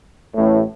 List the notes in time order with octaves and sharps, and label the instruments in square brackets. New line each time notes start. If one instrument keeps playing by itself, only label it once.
[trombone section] A1 A2